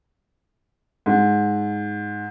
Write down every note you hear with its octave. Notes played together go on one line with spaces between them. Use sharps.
G#2